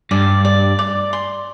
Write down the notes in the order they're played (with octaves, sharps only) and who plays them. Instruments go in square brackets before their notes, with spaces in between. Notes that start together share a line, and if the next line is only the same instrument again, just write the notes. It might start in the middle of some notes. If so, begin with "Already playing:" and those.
[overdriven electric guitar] G2 [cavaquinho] D5
[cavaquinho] D5
D5
C6